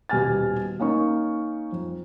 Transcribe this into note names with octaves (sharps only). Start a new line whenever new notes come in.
D#1 B2 G4 G#5 F6 A6
A#3 C#4 D#4 C#6
F2